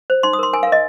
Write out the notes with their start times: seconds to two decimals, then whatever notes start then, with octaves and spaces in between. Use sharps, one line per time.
0.10 C5
0.23 D#4 C6
0.33 D#6
0.39 A#4 C6
0.53 A#4 G#5
0.63 F5
0.67 A#4
0.72 D#5